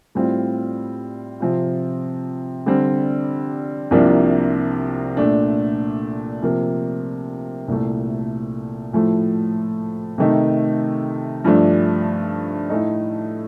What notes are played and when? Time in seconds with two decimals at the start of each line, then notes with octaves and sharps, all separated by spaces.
0.15 A2 G3 C4 F4
1.40 C3 F3 C4 F4
2.66 D3 G3 C4
3.91 C2 C3 F3 A#3 D4
5.17 A#2 A3 D4
6.42 C3 F3 A#3
7.68 C2 A#2 A3
8.93 A2 F3 A3
10.18 C3 D#3 A3 D#4
11.44 G2 F3 A3 D4
12.69 A2 A3 D#4